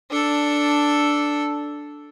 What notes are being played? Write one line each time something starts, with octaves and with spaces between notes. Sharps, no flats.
D4 A4